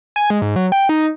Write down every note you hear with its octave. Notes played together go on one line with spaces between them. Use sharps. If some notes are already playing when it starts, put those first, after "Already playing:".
G#5
G#3
G#2
F#3
G5
D#4